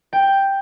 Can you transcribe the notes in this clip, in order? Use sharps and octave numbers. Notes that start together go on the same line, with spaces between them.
G5